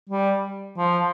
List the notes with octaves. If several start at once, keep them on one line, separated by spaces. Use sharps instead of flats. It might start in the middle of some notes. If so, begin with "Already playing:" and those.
G3
F3